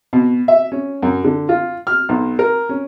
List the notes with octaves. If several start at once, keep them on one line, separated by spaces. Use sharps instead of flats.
B2
E5
C#4
F#2
D3
F4
F6
B1
A#4
C#4